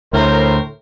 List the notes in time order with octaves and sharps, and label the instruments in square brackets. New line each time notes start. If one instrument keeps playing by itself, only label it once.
[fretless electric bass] D2 [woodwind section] A2 [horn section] A#4 C5